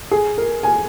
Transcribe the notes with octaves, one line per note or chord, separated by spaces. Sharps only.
G#4
A#4
G#5